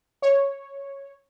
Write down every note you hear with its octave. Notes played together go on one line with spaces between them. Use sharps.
C#5